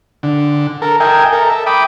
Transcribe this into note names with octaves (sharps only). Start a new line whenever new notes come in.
D3
A4 A#4
A#4 D#5 E5 G5 G#5
A4 A#4
E5
G5 B5 D6 D#6